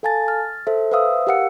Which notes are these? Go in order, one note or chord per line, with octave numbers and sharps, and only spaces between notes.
A4 F5 G#5 A5 A6
F6 A6
A4 C5 E5
B4 C5 E5 F5 D#6 E6
G4 A#4 F5 F#5 E6 C#7